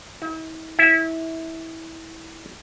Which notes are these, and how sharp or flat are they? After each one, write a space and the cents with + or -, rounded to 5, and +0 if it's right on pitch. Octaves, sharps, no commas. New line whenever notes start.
E4 -45
E4 -20